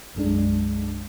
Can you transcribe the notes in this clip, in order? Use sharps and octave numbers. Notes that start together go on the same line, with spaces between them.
B1 F#2 G#3 D4